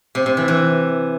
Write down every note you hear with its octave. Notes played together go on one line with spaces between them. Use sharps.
C3
C3
E3
E3